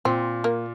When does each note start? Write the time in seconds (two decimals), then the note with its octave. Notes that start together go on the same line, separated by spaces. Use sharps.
0.05 A#2 C4
0.44 A#3